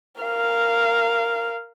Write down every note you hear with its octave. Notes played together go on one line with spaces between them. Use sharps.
A#4 F5